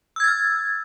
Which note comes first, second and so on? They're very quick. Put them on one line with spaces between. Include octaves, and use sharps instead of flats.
E6 G#6 A6 F6